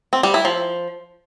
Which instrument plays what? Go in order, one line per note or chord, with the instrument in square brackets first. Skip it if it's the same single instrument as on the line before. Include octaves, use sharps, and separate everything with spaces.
[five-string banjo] C4
G3
E4
F3